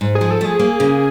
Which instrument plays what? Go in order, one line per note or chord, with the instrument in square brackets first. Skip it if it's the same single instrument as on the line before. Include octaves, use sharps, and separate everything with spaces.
[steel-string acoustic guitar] G#2
[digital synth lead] G#4
[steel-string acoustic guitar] F3
[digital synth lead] A4
[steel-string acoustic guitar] A3 [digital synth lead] G#4
[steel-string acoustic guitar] A#3
C#3